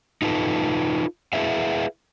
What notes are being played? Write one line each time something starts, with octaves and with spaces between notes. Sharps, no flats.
D#4 F4 A4 B4
E4 G#4 B4 E5 F5